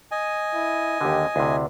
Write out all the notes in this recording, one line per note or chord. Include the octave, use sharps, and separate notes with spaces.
D#5 G#5
E4
D#2 D3 G4
D2 C3 E4